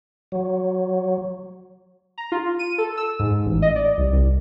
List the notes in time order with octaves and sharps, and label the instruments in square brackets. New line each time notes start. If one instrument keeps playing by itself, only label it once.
[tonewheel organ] F#3
[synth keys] A#5
F4
D#7
A4
E6
G#2
A1
D#5
D5
C2
C2